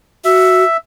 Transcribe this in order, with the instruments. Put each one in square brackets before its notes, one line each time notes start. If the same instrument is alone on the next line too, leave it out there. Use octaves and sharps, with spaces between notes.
[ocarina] F#4 [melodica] E5